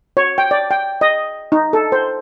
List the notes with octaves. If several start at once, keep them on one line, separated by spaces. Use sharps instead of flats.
C#5
G5
D5
G5
D#5
D#4
A4
C5